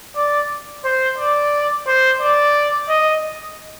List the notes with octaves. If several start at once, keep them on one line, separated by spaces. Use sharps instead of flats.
D5
C5
D5
C5
D5
D#5